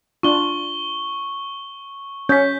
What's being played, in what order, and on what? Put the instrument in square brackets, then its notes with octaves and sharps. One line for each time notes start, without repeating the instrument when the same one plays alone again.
[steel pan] D4 F4 [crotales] C#6 G7
[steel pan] C#4 C#5 [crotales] G6 B6